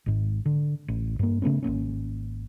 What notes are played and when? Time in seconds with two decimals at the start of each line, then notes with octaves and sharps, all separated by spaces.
0.06 G#1 G#2
0.46 D3
0.88 A1
1.19 G2 A#3
1.42 C#3 A3 B3 C#4
1.63 G#1 A#2 A#3 C#4